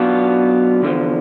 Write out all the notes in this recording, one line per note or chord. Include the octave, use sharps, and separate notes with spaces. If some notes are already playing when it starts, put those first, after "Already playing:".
Already playing: B1 B2 B3 D4 F4
E2 D3 F3